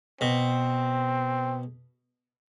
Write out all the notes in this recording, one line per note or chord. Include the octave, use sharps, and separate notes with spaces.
B2 C4